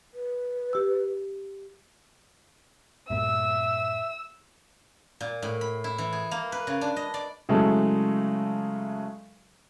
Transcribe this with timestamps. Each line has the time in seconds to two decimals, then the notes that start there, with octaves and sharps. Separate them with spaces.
0.14 B4
0.73 G4 E6
3.10 G2 A#2 E5 E6
5.21 A#2
5.42 A2
5.61 B5
5.84 E4
5.98 E3
6.13 G#4
6.31 A#3
6.52 B4
6.67 C#3
6.81 D4
6.96 D#5
7.14 D5
7.49 C#3 F#3 G#3 A3 E4 A4